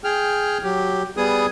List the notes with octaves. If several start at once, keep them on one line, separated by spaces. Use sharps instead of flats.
G#4 G5 F6
F#3 G4
G3 B3 G#4 D#6